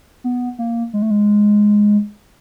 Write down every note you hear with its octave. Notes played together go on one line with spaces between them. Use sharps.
B3
A#3
G#3
A3
G#3